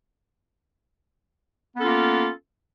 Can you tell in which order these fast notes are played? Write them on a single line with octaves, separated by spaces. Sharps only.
B3 A4 C#4 F4 A#3